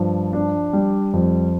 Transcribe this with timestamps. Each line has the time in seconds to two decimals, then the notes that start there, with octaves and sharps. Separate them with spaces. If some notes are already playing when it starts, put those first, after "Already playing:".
Already playing: G2 F3
0.33 D4
0.73 G3
1.13 F2